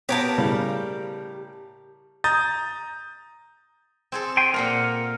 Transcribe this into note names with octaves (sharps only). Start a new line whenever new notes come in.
B3 G4 A#4 C#5 A5
A2 C#3 G3
A#5 D#6 G6 A6
C4 G#4 A4
G5 G#5 C6
A#2 A#3 F4 A#4 F#5